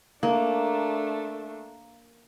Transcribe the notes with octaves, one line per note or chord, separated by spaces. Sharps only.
A3 A#3 D4